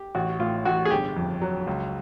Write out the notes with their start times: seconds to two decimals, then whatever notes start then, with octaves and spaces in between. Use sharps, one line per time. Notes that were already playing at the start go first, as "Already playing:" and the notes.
Already playing: G4
0.15 A1 F#4
0.40 A2 F4
0.65 A1 F#4
0.85 G#4
0.90 G1 G4
1.16 F2
1.42 F#3
1.67 C#2